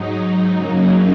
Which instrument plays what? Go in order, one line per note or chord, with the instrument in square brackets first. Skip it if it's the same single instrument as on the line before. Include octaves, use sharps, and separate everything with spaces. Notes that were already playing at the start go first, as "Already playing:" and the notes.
Already playing: [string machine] G#2 F#3 D#4
F#2 C#3 F#3 A#3 D#4